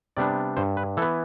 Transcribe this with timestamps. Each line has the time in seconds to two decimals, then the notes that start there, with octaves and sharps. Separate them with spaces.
0.17 C3 G3 B3 D4 D5
0.57 G2 C5
0.77 B4
0.97 E3 A4
1.02 B3